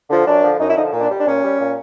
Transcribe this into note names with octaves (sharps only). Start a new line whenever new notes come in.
D3 F3
F#2 D4
D3 F3
F#2 D#4
E4
D3 F3 D#4
A#2
D4
G3
D4
A#2 C#4
G3
A#2